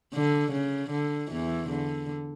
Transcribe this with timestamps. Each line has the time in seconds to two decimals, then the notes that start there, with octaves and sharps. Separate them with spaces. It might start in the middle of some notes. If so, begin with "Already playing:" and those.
0.14 D3
0.52 C#3
0.91 D3
1.31 E2 E3
1.70 D3